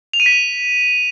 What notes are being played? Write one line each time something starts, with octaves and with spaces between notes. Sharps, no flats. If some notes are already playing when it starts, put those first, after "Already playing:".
F7
D#7
B6
F7